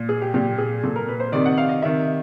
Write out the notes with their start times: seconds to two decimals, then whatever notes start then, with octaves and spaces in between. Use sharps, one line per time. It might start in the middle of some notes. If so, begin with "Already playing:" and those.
Already playing: A#2
0.09 G#4
0.22 G4
0.34 A#2 G4
0.58 G#4
0.84 A#2 A4
0.96 A#4
1.08 B4
1.20 C5
1.32 C3 D#3 D5
1.45 F#5
1.58 F5
1.69 D#5
1.82 C3 D#3 E5